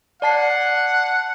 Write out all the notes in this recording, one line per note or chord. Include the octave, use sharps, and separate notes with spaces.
D5 F#5 A5 C7